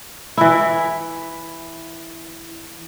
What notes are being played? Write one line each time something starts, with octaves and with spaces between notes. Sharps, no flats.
E3 E4